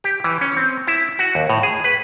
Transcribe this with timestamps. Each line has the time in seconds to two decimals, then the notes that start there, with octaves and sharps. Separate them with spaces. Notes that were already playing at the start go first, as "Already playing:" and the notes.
0.04 G4
0.24 E3
0.41 C#4
0.57 C4
0.87 E4
1.19 F#4
1.35 D#2
1.50 A2
1.63 G#4
1.84 B4